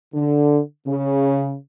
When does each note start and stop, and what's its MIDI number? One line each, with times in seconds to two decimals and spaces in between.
0.14 0.60 50
0.87 1.55 49